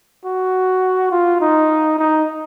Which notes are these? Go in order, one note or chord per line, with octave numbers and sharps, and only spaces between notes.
F#4
F4
D#4
D#4